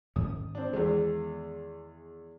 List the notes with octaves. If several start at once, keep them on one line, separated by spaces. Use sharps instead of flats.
G#2 D#3 C#4 D#6
C4 D4
E2 D#3 G#3 B3